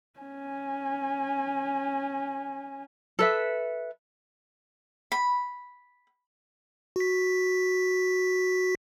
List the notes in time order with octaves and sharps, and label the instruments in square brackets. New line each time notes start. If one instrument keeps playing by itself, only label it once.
[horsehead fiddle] C#4 G#5
[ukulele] A4 B4 E5
[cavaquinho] B5
[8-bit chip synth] F#4 B6